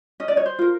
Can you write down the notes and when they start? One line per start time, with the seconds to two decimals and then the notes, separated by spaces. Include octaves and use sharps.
0.20 C#4 D#5
0.28 D5
0.37 C#5
0.46 C5
0.59 F4 A#4